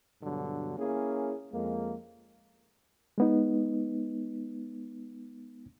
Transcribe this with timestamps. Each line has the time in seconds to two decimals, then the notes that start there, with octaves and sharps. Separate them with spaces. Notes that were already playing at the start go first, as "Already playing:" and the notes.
0.23 G2 B2 D3 F#3
0.78 A#3 C#4 E4 G#4
1.52 F2 G#3 A#3
3.18 G#3 B3 D#4